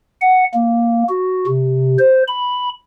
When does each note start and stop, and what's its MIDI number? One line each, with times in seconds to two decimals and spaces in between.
0.21 0.44 78
0.54 1.03 58
1.09 1.46 66
1.47 1.97 48
1.99 2.23 72
2.28 2.69 83